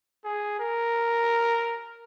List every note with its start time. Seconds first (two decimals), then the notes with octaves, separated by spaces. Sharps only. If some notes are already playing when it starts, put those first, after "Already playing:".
0.24 G#4
0.59 A#4